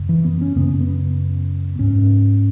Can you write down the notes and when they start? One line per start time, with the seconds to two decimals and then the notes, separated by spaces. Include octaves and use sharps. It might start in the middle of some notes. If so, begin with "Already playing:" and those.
Already playing: F#2 C#3
0.09 E3
0.24 B3
0.41 C#4
0.56 F#2 C#3 B3
0.68 C#4
0.81 B3
1.79 G#2 C#4